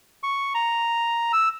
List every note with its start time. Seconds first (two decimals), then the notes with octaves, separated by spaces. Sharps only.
0.23 C#6
0.55 A#5
1.33 E6